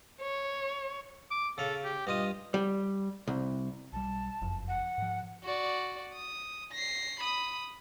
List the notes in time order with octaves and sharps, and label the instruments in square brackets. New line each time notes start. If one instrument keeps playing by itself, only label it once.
[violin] C#5
[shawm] D6
[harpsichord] C#3 F5 [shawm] A4
[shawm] G4
[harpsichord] G2 F4 D#6 [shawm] D#5
[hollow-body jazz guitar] G3
C2
[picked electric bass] B1 G3 [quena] A5
[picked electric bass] F#1 F2
[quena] F#5
[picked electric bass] G#2 F3
[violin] F#4 D5
D#6
A#6 C7
B5 D#6